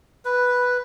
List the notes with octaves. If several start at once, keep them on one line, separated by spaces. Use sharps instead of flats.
B4